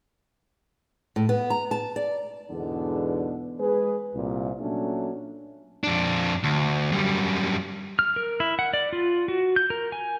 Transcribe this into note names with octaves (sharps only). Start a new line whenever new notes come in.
A2
B3
A#5
A5
D5
E2 G#2 B2 D3 B3 D4
G#3 G#4 B4
C2 A#2
A#2 F#3 A3 C#4 D4 A4
F2 D4
D2
F#2 G3
F6
A#4
E4
F#5
D5
F4
F#4
G6
A#4
G#5